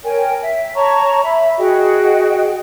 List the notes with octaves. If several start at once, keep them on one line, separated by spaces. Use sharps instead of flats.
A#4 C#5 G5 G#5
E5
C#5 A5 A#5 C#6
E5 B5
F#4 G#4 D#5 G5